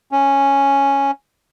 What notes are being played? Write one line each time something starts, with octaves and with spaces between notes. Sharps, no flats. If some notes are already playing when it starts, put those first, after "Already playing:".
C#4